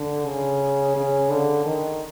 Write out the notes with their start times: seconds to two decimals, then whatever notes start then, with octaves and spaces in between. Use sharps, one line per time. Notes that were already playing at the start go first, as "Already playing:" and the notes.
Already playing: D3
0.26 C#3
0.96 C#3
1.30 D3
1.65 D#3